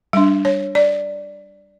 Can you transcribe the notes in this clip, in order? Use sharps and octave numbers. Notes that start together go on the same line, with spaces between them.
G3 D4 E5
C#5
D5